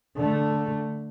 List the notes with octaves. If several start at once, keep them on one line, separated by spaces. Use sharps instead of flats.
D3 A3